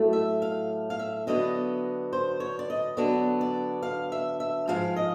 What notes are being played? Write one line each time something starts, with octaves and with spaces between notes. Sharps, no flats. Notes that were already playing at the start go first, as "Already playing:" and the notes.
Already playing: A2 F#3 A3
E5
F5
F5
E5
D3 F#3 B3 D#5
C5
C#5
D5
D#5
D3 F#3 B3 D4
D5
F5
E5
E5
G#2 F3 G#3 F5
D#5